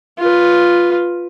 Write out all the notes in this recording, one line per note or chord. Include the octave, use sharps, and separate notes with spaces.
F4 B4